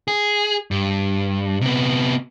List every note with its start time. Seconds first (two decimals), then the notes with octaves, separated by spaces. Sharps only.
0.08 G#4
0.71 G2
1.61 C3 B3